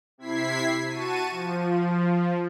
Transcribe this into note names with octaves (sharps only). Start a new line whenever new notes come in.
C3 E4 G#6 B6 C7
F#4 A5 C#6 D#7
F3